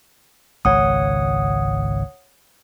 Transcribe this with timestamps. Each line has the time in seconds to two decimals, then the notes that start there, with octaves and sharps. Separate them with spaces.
0.65 G#1 C#2 C#3 C#5 F#5 D#6